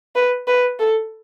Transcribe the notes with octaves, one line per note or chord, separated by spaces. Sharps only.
B4
B4
A4